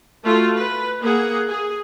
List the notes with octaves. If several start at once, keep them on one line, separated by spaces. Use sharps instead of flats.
A3 F4 F#4
B4
A#3 G#4 F#5
G#4